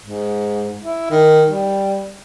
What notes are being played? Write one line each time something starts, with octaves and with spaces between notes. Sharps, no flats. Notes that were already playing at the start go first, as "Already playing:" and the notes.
G#2
E4
D#3
G3